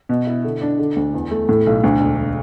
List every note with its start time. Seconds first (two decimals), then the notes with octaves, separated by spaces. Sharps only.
0.09 B2
0.27 E4
0.44 D3
0.62 D4
0.79 D3
0.96 D2
1.14 E2
1.31 A3
1.49 A2
1.66 B1
1.84 D2
2.00 E1